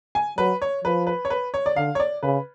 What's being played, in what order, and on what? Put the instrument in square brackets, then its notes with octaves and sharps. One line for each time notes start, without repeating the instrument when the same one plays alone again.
[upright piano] G#5
[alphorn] F#3 [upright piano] B4
[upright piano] C#5
[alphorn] F3 [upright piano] B4
[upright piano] B4
C#5
B4
C#5
D5
[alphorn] D3 [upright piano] F5
[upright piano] C#5
D5
[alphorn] C#3 [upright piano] B4